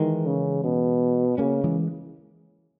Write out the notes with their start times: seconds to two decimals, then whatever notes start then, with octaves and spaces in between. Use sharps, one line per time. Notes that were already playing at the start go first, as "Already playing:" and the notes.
Already playing: D#3 E3 G#3
0.26 C#3
0.64 B2
1.38 C#3 A#3 C#4
1.64 E3 G#3